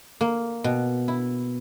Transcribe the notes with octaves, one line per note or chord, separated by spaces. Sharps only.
A#3
B2
E4